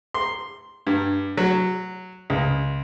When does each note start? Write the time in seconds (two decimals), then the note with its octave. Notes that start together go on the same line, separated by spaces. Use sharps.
0.14 C6
0.87 G2
1.37 F#3
2.30 C#2